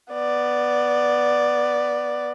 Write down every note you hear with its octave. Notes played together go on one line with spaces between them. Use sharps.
B3 D5